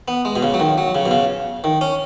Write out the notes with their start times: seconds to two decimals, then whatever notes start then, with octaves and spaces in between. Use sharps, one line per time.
0.08 B3
0.25 G#3
0.36 B2
0.43 C#3
0.54 F#3
0.60 D#3
0.78 F#3
0.95 C#3
1.06 B2
1.11 C#3
1.64 D#3
1.81 C#4